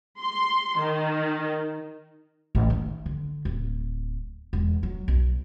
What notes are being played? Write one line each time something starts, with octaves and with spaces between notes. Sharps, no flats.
C6
D#3
A1
D#3
D3
D1
E1
F#3
B1